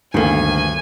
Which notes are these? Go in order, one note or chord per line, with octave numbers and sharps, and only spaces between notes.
G1 D2 D#3 A#3 A4 G#5